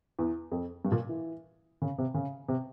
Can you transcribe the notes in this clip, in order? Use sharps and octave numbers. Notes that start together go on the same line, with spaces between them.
E2
F2
G2
A#2
E3
C#3
C3
C#3
C3